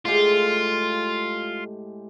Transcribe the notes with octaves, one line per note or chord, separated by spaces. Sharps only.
A2 G#3 F4 G4